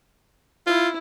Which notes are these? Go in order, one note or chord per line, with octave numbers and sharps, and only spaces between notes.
E4 F4